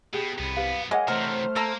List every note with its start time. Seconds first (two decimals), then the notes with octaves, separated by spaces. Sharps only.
0.13 B2 G4 G#4
0.38 C2 F#2 B3 B5
0.57 G4 B4 F5
0.91 G#3 A#3 G#4 C#5 D#5 F#5
1.08 C3 E3 A3 A#4 C5 F6
1.56 A#3 A4 A#5